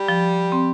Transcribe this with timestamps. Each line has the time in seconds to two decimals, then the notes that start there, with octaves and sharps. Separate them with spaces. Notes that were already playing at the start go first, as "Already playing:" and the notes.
Already playing: G3
0.08 F3
0.52 C4